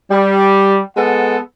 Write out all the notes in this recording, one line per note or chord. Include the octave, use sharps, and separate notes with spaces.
G3
G#3 B3 A4 F#5